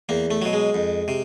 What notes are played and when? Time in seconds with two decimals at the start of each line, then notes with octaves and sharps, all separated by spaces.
0.09 E2 A#3
0.31 A3
0.42 B2 F#3
0.53 G#3
0.74 F2
1.08 C3